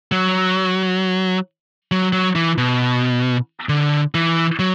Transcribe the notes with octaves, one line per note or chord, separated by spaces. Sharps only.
F#3
F#3
F#3
E3
B2
D3
E3
F#3